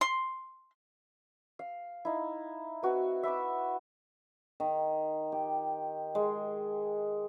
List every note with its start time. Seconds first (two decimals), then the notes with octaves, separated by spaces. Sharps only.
0.01 C6
1.59 F5
2.05 D#4 E4
2.83 C4 F#4 B4
3.23 E5 B5 D6 E6
4.60 D#3
5.32 G4
6.15 G#3